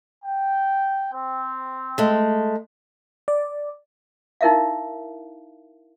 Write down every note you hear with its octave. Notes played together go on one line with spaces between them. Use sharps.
G5
C4
G#3 A3
D5
D#4 E4 A#4 E5 F5